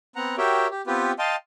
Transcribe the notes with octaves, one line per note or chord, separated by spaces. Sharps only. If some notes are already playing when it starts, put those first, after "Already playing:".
B3 C4 F#5 A#5
F#4 G4 A#4 C#5 E5 G5
G4
B3 C4 F4 G4 B4
D#5 F5 G5 A5 C6